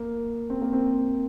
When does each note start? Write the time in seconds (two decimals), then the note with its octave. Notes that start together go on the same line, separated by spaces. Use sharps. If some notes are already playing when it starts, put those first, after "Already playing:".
Already playing: A#3
0.50 C4
0.61 A#3
0.73 C4